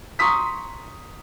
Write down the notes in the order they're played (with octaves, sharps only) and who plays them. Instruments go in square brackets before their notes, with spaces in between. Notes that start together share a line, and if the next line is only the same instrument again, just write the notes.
[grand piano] A#5 C6 C#6 D#6 B6